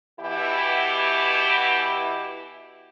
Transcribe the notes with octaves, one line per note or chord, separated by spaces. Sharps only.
B2 E3 E4 G4